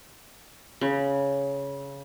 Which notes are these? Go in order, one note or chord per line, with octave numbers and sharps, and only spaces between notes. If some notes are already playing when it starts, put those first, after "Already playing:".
C#3